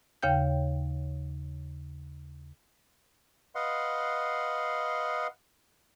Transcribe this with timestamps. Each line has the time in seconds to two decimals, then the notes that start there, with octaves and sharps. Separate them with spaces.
0.23 D#2 C#3 C#5 F5 G5 G6
3.55 B4 D#5 F5 F#5 C6